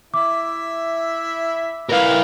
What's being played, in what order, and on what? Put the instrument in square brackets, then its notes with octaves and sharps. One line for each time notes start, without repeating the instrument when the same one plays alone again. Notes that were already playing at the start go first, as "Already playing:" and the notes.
[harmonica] E4 E5 [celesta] D6
[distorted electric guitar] E4 A#4 [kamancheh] B4 F5